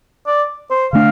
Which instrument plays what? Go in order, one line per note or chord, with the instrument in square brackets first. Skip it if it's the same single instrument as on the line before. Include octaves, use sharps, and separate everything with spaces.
[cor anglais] D5
C5
[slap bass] D3 A3 D4 [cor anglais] F5